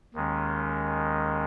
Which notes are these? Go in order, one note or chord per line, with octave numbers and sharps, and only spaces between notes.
D#2 D#3 G#3 C#4